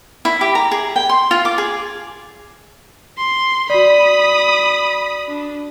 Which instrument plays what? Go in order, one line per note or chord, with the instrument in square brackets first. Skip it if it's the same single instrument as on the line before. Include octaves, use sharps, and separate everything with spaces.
[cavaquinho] E4
G4
A#5
G#4
G5
C6
F4
D6
G#4
[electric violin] C6
[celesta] F#4 D5 [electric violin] B5 D#6
[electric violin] D4